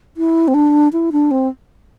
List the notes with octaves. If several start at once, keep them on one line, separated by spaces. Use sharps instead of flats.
E4
C4
D4
E4
D4
C4